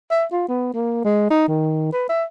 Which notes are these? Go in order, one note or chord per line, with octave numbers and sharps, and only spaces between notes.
E5
F4
B3
A#3
G#3
D#4
D#3
B4
E5